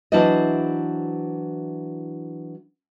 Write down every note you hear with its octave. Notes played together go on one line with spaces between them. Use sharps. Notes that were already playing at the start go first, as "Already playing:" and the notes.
E3 F#3 D4 E4 C5 D#5